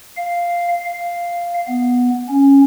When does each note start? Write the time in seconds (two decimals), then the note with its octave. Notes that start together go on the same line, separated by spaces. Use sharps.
0.17 F5
0.85 F5
1.68 B3
2.29 C#4